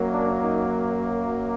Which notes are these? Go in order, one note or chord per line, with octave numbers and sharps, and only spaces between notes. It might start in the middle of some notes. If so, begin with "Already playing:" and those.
Already playing: F#2 F#3 A#3
D4
D#4